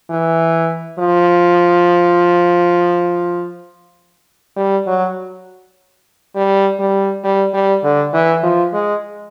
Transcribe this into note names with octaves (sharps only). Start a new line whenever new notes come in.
E3
F3
G3
F#3
G3
G3
G3
G3
D3
E3
F3
G#3